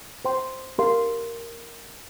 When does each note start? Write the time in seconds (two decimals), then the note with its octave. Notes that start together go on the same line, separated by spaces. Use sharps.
0.25 C5 G5 C6
0.78 G4 A#4 F5 C6